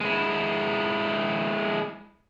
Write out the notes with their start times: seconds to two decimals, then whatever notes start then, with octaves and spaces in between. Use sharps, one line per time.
0.01 G#3 E4